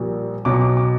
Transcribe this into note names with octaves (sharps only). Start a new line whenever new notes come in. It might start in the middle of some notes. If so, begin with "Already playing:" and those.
Already playing: A#1 A#2 G3
B1 B2 F#3 D6
C#6
D6
D6